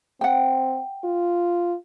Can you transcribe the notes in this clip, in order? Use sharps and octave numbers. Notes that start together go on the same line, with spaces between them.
C4 F#5 G5
F4